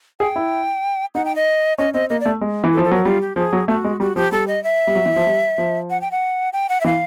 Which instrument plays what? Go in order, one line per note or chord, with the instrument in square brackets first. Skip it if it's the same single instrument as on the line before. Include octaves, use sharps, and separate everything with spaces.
[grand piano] G#4 [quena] G5
[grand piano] E4
[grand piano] D#4 [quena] F#5
[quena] G5
D#5
[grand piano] C#4 [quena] D#5
[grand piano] C4 [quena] D#5
[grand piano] A#3 [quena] D#5
[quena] D5
[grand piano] A3
G#3
E3
[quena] A4
[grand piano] F3
[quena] A4
[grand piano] F#3 [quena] A#4
[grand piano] G3 [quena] F4
[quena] G4
[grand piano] F3 [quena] G#4
[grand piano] F#3
[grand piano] A3 [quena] F#4
[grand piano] G#3
[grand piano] G3 [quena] F#4
[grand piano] F3 [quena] G4
[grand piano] G3 [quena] A4
[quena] D#5
E5
[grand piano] G3
F#3
E3
F3
G3
F3
[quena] F#5
G5
F#5
G5
F#5
E5
[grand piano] E3 [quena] F5